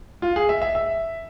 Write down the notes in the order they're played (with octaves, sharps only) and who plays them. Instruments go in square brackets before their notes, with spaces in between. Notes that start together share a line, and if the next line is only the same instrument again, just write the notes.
[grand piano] F4
G#4
E5
E5
E5